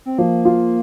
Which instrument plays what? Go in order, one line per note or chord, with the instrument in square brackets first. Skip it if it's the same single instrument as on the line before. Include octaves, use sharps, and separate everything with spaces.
[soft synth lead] C4
[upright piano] F3 [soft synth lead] A#3
[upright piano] F4